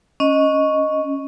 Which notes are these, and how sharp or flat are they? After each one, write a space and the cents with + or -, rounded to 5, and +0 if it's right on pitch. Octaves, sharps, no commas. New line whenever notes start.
C#4 +0 D#5 +0